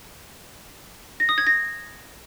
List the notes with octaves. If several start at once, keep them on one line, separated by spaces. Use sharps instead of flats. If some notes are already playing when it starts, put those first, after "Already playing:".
A#6
D#6
G#6
A#6